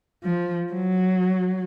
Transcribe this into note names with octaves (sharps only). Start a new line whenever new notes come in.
F3
F#3